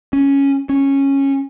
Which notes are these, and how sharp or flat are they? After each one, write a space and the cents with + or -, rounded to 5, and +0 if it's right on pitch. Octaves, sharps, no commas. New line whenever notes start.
C#4 +0
C#4 -10